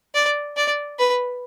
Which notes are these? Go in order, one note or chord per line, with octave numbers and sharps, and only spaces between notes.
D5
D5
B4